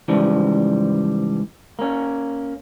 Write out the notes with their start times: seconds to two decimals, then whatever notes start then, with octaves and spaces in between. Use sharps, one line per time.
0.08 G#2 C#3 E3 F3 G3
1.79 A#3 C#4